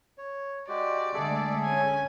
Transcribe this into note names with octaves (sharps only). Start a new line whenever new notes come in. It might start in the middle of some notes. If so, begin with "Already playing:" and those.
C#5
G#3 F#4 G4 D5
D3 G#3 A3 G#4 A4 E5
C#4 G#5